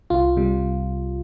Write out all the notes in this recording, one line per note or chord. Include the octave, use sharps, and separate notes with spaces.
C2 F4
C3 G3